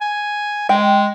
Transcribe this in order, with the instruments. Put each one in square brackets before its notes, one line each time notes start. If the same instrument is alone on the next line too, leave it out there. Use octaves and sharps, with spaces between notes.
[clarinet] G#5
[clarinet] G#3 [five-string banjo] G5